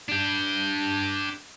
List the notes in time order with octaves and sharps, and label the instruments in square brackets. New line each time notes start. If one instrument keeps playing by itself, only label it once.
[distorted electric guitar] D4 G4